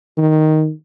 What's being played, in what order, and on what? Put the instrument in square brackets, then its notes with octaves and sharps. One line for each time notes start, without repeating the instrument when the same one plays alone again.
[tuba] D#3